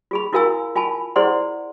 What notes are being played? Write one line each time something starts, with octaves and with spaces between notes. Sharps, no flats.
F4 G#4 B5
E4 F#4 A#4 F5 G#5 E6
F4 G#5 A5 B5
E4 G#4 C5 D5 F#5 C6